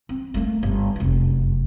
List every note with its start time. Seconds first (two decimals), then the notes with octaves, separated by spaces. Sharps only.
0.09 C4
0.34 A3 A#3
0.63 G1
0.96 F1 F#2